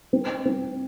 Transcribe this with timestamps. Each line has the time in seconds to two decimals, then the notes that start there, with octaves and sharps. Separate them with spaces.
0.13 C4
0.45 C4